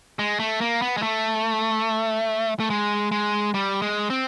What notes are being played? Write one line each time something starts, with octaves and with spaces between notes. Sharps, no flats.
G#3
A3
A#3
B3
G#3
A3
A3
G#3
G#3
G3
G#3
C4